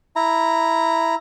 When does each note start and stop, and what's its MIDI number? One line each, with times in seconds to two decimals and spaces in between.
0.16 1.15 64
0.16 1.15 82